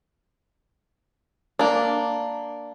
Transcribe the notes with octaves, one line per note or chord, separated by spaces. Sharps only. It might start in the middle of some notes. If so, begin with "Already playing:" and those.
A#3 D4